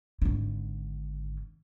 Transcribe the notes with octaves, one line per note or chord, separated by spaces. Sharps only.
G#1 D3